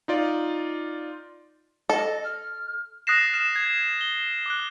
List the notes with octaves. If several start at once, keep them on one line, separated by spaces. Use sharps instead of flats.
D#4 F4 D5
A4 D#5
F6
D#6 F#6 A6 A#6 C7 E7
F6 E7
G#6
G7
D6 D#6 F#6